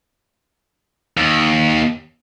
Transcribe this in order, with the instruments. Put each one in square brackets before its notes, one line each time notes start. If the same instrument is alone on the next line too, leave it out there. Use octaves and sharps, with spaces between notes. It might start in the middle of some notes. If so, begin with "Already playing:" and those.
[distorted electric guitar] D#2